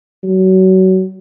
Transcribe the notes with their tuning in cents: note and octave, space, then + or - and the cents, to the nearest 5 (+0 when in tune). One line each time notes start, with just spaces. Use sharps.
F#3 +25